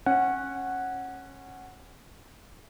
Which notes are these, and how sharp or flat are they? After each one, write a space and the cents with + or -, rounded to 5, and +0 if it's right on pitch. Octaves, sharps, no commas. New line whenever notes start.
C#4 -20 F#5 +0